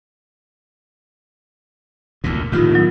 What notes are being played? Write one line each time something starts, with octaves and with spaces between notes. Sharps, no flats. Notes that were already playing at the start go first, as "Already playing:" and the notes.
D2 A#2
A2 D#3 F4 G4
F#3 B3